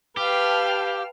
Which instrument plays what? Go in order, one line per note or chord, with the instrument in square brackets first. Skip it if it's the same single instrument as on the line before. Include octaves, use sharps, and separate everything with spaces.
[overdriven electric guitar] G4 [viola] B4 [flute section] F5 G5 A5 [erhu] F6